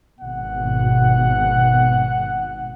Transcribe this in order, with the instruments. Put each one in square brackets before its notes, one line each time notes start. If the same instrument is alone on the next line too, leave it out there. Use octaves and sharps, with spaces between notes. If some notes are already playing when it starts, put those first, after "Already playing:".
[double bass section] G#1 B2 [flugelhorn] F#5